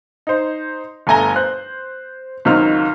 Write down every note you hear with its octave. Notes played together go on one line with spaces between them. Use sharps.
D#4 C5
G1 A3 G#5 A#5 G7
C5 F#6
C#2 D#3 F#3 C4 F6